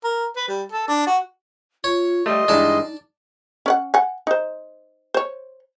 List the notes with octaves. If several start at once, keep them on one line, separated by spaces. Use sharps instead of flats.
A#4
B4
G3
A4
D4
F#4
F4 C#5
G3 A3 G4 D#5 C6
G2 E3 G#3 D#4 D5 A5
C#4 D5 F#5
F#5 G#5
D#4 C5
C5 C#5